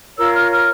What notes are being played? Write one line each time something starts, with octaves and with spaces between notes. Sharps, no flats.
F4 A#4 C#5 E6
F6
F6